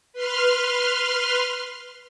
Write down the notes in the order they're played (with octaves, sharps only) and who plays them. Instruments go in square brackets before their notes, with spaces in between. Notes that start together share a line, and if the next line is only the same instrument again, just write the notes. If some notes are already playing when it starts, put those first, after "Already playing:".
[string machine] B4 C6 F6